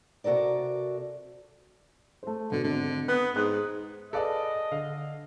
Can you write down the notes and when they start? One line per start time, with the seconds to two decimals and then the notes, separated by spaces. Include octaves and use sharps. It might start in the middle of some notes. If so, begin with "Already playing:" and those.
0.24 C3 F#4 A4 A#4 D5
2.23 A3 C5
2.52 B2 D3
2.64 G#1 D3
3.08 B3 D#6 F#6
3.36 G#2 D#6 F#6
4.13 G#4 A4 B4 D5 D#5 F5 A5
4.72 D3 F5